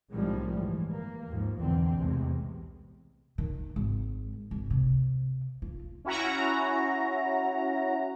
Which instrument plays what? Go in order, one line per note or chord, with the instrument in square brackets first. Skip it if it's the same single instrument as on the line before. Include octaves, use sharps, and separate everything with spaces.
[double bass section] C2 A2 D#3 F3 G3 G#3
G1 E3
A#3
D#2 G#2 F3
B1 E2 B2 D3 E3 C4
B1 E2 A2 C3 G#3
[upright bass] D#3
G#1
G#1
C3
F4
[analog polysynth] C#4 E4 F#4 A#5